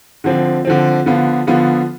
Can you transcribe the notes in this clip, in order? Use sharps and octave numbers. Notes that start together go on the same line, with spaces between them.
D3 F3 C4
D3 F3 C4
D3 F3 B3 F4
D3 F3 B3 F4